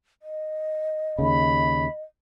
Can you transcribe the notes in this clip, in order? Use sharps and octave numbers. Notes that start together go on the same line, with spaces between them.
D#5
D#2 C#3 B5